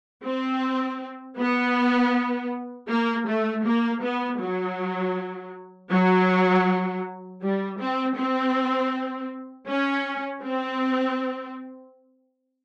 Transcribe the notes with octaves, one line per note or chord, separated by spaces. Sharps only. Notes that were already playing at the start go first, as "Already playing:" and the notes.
C4
B3
A#3
A3
A#3
B3
F#3
F#3
G3
C4
C4
C#4
C4